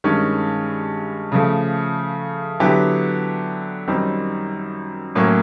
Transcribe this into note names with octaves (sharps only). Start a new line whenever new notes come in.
G2 D#3 G#3 C#4
C#3 F3 A3
D3 F#3 B3 E4 G4
F#2 D#3 G3 C4 D#4
A2 F#3 A#3 C#4